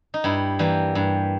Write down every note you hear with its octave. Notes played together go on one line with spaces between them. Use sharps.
D#4
G2 E4
E3 G3 A#3
G2